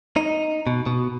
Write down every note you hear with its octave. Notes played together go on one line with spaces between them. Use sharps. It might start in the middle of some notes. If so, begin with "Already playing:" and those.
D#4
B2
B2